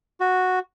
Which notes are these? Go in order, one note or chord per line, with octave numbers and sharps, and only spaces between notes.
F#4